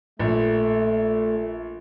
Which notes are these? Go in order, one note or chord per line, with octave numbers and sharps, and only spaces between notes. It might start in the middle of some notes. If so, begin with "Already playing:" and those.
A#1 A3